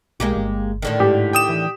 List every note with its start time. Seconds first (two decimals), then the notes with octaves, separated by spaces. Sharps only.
0.20 B1 G#3 A#3 G4
0.36 G1
0.82 A2 D3 D#3
1.00 G#2 G4
1.33 G5 D#6 E7
1.49 E3